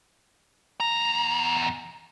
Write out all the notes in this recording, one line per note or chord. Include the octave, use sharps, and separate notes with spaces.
E2 A#5